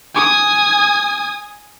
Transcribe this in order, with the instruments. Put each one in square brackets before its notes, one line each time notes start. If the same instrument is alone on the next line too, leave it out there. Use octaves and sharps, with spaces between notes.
[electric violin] G#5 D#6